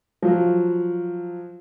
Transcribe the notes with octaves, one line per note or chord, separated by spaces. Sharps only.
F3 F#3